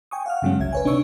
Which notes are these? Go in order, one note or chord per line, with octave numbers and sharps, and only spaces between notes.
G5 G#5 C#6 D#6
F5 F#5 F6
G2 C#3 F#3 G#3 C#4
G1 C#2 E5 G#6
B4 C#5 G#5
C3 D4 D#4 C#5 C#6 E6